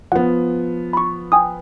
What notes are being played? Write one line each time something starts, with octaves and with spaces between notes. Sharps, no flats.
F3 B3 F#5
B5 C#6
G5 G#5 D#6